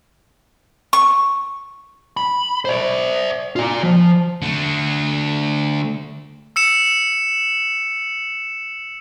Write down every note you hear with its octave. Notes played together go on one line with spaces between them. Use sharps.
C#6
B5
C5 D5
F4 D5
F3
D3 A3
E6 C#7 E7